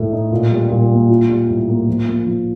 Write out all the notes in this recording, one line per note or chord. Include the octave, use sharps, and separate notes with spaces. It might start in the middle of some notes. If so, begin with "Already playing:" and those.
Already playing: A2 A3 A4
D#4
A#2
G3
A#2
A#3
F4
G3
A2
A#3
F3
A#3
F3